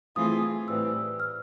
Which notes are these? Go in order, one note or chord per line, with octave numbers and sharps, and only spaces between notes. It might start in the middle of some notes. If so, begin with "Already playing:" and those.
E3 A3 C4 F4 G#4 D#6
D#6
A2 E3 G3 C4 E6
F6